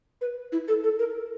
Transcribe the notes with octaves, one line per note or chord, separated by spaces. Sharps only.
B4
E4
A4
A4
A#4